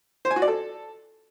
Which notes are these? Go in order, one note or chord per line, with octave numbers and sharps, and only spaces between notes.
C5
G#5
F#4
D5
A4